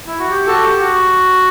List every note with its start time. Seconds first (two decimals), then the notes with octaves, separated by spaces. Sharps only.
0.07 E4
0.19 F#4
0.30 G4
0.47 F#4 A4
0.64 G4
0.79 F#4